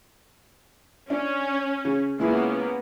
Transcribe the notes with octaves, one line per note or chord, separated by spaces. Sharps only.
C#4 D4
C#3
C#2 A#3 B3 C#4 E4 G#4